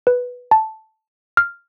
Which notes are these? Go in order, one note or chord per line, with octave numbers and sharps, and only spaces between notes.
B4
A5
F6